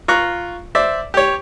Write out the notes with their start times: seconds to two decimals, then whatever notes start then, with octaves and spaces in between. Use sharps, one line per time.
0.08 F4 A#5 C#6 F#6
0.75 C5 D5 E5
1.14 G4 C#5